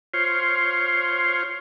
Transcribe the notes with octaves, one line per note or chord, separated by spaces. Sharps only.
F4 C5 C#5